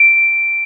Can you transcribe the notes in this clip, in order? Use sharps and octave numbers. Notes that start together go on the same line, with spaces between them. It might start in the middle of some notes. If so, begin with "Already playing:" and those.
Already playing: D7